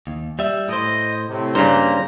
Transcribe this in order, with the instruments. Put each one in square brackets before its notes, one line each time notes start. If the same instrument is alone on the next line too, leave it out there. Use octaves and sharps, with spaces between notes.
[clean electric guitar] D#2
G3 E5
[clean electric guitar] A2 C5 [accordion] D#5
[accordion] A2 C3
[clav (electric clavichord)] G2 C#3 [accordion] A#3 A#5 [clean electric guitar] D4 C5